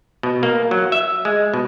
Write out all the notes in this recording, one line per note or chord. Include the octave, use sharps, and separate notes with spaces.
B2
A#3
F#3
E5
G#3
B2